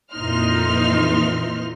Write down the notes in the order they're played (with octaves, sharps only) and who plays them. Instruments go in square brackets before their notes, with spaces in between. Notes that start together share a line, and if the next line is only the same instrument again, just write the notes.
[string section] F2 A#2 E3 D#4 C6 F6